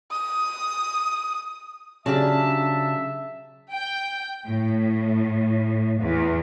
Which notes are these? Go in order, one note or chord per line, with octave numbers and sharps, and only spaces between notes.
D#6
C#3 F#3 D4 G4 E5 A5
G5
A2
E2